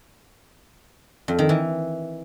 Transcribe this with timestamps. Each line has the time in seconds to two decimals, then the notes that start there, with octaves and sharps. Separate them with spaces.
1.28 F2
1.39 D#3
1.49 E3